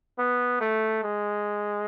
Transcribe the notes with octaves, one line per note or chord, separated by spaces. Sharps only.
B3
A3
G#3